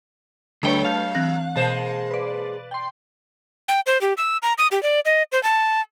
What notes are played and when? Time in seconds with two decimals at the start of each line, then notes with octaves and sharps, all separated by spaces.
0.63 D2 F#3 A3 D4 B4 C#5 G5
0.85 F5 A5 F6 G6
1.15 E3 C4 F#6 A#6
1.56 B2 G#3 A#3 C5 A5
2.11 B4 D5
2.71 G5 C6
3.68 G5
3.86 C5
4.01 G4
4.17 E6
4.42 A#5
4.58 D#6
4.71 G4
4.83 D5
5.05 D#5
5.32 C5
5.43 A5